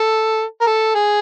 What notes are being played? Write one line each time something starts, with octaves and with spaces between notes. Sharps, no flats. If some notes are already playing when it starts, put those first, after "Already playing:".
Already playing: A4
A#4
A4
G#4